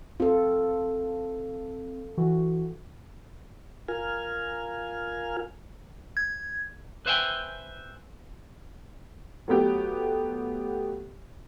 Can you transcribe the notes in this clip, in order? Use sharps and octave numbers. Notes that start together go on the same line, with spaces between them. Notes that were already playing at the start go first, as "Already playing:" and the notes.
C4 F4 A4
E3 F#4
F4 A#4 G#5 F6
G#6
B4 C5 E5 F5 G5 G#5
F#3 A3 B3 G4